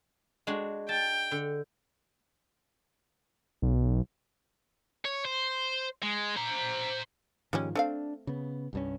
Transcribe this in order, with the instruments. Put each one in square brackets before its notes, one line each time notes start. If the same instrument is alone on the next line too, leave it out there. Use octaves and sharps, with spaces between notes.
[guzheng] G#3 D4 F#4
[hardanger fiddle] G5 [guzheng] A5
[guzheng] D3
[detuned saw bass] B1
[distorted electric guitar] C#5
C5
G#3
C5 A#5
[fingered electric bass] G#2 D#3 F3 [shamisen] G3 G#3 C#4
[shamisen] A3 C4 F5 [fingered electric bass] D4
[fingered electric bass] C#3 B3
C2 G2 C#4